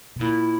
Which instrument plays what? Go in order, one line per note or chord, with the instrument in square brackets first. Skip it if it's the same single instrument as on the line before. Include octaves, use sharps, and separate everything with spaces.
[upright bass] B2
[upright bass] A#2 [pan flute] E4